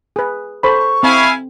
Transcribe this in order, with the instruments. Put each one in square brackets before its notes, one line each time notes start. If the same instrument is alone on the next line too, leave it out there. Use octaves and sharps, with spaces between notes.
[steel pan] G#4 B4
[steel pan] A4 C5 B5 [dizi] C#6
[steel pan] C4 [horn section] E4 F5 G#5